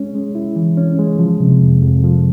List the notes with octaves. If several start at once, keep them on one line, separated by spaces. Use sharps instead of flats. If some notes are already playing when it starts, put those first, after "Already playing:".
Already playing: G#3 C#4
G#3
E4
E3
C#4
G#3
F3
C3
F2
F2
F3